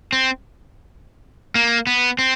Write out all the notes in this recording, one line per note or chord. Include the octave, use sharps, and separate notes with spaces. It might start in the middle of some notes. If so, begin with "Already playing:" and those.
C4
A#3
B3
C4